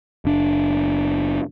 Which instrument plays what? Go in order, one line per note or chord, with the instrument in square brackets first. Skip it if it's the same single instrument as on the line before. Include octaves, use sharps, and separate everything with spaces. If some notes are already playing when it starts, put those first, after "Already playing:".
[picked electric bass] F#1 D4